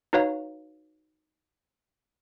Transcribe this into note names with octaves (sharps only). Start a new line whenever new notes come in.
D#4 F#4 B4 C#5 F5 A#5